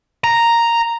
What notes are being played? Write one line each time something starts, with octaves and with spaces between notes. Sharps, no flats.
A#5